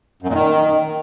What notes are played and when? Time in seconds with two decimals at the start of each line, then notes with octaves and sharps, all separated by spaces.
0.22 F#2
0.28 A#2
0.33 D#3